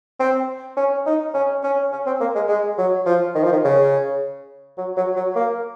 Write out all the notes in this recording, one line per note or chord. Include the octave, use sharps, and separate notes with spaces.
C4
C#4
D#4
C#4
C#4
C#4
C4
A#3
G#3
G#3
F#3
F3
D#3
F3
D#3
C#3
F#3
F#3
F#3
A#3